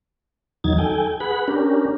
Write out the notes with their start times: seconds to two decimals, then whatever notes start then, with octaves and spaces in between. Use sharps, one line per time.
0.64 E2 D#3 F#3 D#4 G#6 A6
0.78 A4 G5 G#5
1.20 G#4 B4 F#5 B5
1.48 C#4 D4 G4 A#4